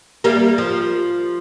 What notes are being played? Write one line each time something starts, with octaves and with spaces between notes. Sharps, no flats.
G3 A#3
F3